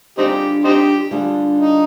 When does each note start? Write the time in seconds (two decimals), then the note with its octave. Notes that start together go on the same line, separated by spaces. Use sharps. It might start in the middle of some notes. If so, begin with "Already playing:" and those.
0.18 D3 G3 C4 D4 D#4 F4 G4 G#4
0.64 C4 D#4 G4
1.11 D3 G3 D4 F4 G#4
1.58 D#4